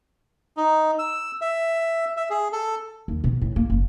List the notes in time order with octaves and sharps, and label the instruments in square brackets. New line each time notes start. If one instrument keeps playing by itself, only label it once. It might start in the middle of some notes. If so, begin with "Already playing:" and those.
[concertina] D#4
E6
E5
E5
G#4
A4
[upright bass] D#2
B2
A2
A#3
F#1